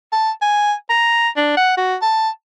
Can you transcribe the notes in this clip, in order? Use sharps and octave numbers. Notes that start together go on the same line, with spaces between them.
A5
G#5
A#5
D4
F#5
F#4
A5